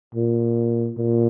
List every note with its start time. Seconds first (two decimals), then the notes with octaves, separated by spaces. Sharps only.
0.15 A#2
0.98 A#2